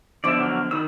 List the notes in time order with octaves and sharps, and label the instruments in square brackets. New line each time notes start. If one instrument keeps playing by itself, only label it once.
[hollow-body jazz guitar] D3 F3 B3 [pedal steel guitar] D5 E5
[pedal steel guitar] F#3 F6
[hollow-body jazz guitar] D#3 [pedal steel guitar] B5 D#6 E6